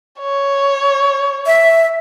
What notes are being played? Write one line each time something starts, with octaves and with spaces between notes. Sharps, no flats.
C#5
E5